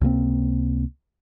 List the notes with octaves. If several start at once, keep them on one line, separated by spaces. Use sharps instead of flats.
C#2 C3 A#3 C4